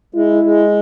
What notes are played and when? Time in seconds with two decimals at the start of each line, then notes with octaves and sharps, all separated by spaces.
0.15 G#3 E4
0.44 G#3